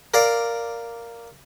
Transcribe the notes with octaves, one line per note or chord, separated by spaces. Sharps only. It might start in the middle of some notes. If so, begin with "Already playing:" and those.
A#4 D5 F5